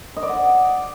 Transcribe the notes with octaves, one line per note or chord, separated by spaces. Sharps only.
D#5
D5
F#5